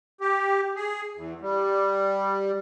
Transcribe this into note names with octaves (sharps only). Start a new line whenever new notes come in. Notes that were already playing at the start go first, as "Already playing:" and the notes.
G4
G#4
E2
G3